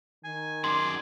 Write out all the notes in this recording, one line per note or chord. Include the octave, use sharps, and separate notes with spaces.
D#3 G#5
F#2 G#4 D5 C6